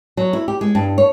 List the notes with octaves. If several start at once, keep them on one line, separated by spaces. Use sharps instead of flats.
F#3
E4
G4
G#3
G2
C#5